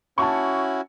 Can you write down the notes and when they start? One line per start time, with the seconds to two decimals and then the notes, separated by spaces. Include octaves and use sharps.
0.18 C#4 E4 F#4 A5 C#6